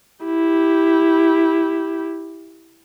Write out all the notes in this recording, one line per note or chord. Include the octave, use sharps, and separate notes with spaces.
E4 G4